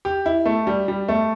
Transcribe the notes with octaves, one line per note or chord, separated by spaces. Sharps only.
G4
E4
A3
G3
G3
A3